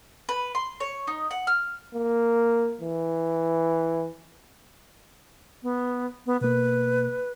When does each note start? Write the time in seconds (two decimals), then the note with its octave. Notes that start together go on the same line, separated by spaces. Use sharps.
0.29 B4
0.55 C6
0.80 C#5
1.07 D#4
1.31 F#5
1.47 F6
1.95 A#3
2.81 E3
5.63 B3
6.26 B3
6.41 B2 A#3 B4